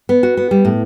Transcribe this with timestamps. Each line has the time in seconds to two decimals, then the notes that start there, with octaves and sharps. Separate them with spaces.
0.09 B3
0.23 F#4
0.37 B3
0.51 G3
0.65 A2